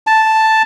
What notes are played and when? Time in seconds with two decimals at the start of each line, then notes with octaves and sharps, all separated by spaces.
0.07 A5